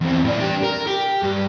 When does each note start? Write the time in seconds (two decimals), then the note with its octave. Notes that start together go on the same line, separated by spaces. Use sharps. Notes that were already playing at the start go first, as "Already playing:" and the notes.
0.01 E2 C4
0.25 A2 D5
0.39 D4 G4
0.63 A#4
0.87 G4
1.23 G2 G3